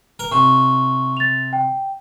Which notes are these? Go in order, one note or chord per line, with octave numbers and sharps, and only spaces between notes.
A#4
C3 C#6
A6 F7
G5